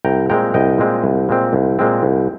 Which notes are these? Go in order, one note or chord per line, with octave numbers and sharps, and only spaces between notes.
C2 G5 A#5
A#2 G#3 C4 G5 A#5
C2 D#5 G5
A#2 G#3 C4
C2
A#2 G#3 C4
C2
A#2 G#3 C4
C2